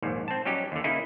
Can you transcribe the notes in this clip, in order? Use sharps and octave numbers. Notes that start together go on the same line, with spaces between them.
A#1 D#2 G#2
C4 A5
F#3 G3 C#4 D#4 G4
D#2 D3
C#3 A#3 D#4 E4 G#4